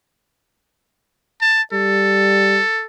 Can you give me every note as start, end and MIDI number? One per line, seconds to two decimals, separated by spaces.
1.41 1.62 81
1.73 2.60 55
1.73 2.85 69